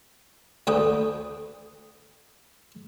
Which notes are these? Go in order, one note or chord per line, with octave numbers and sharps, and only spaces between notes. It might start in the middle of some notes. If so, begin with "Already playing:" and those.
D2 D3 B4 G5 D#6